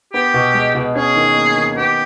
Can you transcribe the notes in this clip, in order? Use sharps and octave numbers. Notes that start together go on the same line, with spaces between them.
B3 G4
B2
G#3
B2
C#4 G#4
D#3
A#3
D#3
B3 G4